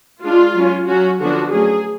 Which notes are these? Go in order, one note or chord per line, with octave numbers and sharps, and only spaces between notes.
G#3 D4 F4
F#3 C#4
F#3 C#4 F#4
D3 F3 B3 D4 F#4
F#3 A3 C#4 G#4